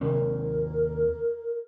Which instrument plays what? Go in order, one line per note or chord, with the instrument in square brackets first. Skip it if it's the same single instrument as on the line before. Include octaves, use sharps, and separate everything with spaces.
[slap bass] D#2 C3 C4 [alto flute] A#4